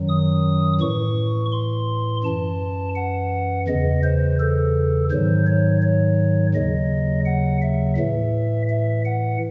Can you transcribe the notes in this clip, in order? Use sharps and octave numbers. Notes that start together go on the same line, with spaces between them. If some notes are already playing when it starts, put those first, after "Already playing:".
Already playing: F#2 D#3 F#3
D#6
A2 E3 C#6
C6
F#2 E3 A5
F#5
E2 C#3 E3 D#5
C5
A4
G#2 D#3 F#3 C5
C#5
C#5
D#2 C#3 F#3 D#5
F#5
E5
A2 E3 E5
E5
F#5